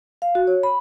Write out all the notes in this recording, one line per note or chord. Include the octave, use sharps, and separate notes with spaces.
F5
F#4
C#5
B5